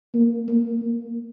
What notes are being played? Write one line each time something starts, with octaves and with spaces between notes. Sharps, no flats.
A#3
A#3
A#3